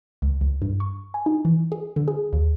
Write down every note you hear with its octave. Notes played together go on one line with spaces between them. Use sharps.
C#2
C#2
G2
C#6
G#5
D#4
E3
G#4
D3
G#4
D#2